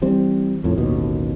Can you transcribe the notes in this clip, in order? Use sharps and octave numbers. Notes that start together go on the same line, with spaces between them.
E3 G3 C4
F2 A2
A1 D#2 B2